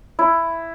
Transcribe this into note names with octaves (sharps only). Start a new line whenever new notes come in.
E4